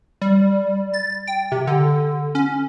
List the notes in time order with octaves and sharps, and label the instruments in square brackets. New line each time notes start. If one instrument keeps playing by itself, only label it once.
[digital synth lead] G3
A6
G5
C3
D3
C#4